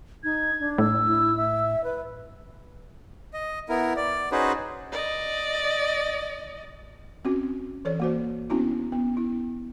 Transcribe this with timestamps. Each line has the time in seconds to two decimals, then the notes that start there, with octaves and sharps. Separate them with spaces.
0.23 D#4 G#6
0.59 D4
0.78 A2 E6
1.06 E4
1.36 E5
1.83 B4
3.34 D#5
3.69 B3 E4 A#4
3.96 D5
4.32 C#4 D#4 F#4 G#4 B4 C5
4.92 D5 D#5
7.25 C4 C#4 F#4
7.85 E3 A4 C#5 D5
8.00 A#3 F#4 C5
8.50 B3 C#4 D4 E4 F#4
8.92 B3
9.17 E4